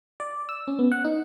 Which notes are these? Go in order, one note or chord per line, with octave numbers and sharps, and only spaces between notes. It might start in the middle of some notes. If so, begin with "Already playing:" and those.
D5
E6
C#4
B3
F#5
D#4